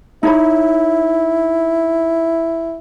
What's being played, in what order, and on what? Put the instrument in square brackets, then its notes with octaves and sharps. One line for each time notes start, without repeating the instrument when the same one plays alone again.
[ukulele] D#4 C#5 B5 [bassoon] E4